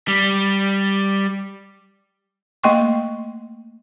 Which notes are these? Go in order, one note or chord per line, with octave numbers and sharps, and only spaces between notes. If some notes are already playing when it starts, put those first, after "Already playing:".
G3
A3 A#3 D#5 G5 C6 C#6